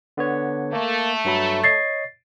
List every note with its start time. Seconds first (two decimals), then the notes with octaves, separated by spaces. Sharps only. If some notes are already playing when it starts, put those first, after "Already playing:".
0.17 D3 B3 C#5
0.73 A3 A#3
1.25 G2 F#3 B5
1.64 C#5 D#5 C#6 A6 C7